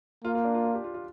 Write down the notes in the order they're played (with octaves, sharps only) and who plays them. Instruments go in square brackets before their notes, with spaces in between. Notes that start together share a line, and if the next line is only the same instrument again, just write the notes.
[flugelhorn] A#3 [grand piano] F4
[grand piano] F4
D4
F4
F4
G4
F4
F4